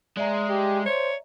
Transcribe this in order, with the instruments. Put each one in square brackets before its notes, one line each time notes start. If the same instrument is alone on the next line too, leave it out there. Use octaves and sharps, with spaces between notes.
[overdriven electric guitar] G#3 [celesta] D5 E5 A#5
[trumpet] G4
[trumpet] C5 [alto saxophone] C#5